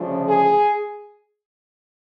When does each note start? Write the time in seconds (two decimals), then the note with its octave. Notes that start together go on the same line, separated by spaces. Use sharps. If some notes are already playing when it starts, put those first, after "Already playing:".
Already playing: D2 C#3 F3
0.27 G#4